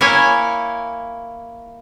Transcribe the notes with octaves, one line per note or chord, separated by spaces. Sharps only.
A#3 E4 C#5 G#5